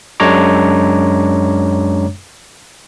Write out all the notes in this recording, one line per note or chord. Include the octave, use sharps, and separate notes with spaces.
F#2 G#3 D4 C#5 A#5 D6